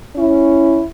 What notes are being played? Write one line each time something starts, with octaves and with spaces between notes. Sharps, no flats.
C#4 E4